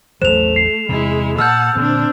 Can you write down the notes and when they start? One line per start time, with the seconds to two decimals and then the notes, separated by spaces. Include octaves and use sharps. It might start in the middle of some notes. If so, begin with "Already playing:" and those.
0.22 A1 E2 F#3 A3 C5 E7 F7
0.56 C7
0.89 E2 C3 G#3 E4
1.39 A#2 A#3 F#5 A5 E6 F6 G6
1.77 A#2 D3 C4 D4